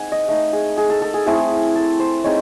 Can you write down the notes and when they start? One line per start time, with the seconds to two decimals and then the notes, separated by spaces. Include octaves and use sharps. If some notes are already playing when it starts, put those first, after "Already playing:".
Already playing: G#3 C4 D#4 F#5 G#5
0.12 D#5
0.28 A3 D#4
0.53 G#4
0.77 G#4
0.90 A4
1.02 A4
1.14 G#4
1.26 A3 C4 E4 G#4
1.76 A4
2.00 C5
2.24 G#3 C4 D#4 C#5